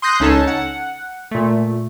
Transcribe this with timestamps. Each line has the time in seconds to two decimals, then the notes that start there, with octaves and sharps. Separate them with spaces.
0.02 C6 D#6 F#6 G6 A#6 C7
0.20 C#2 C#4 D#4 A4 C#5 A5
0.47 F#5
1.31 A#2 A3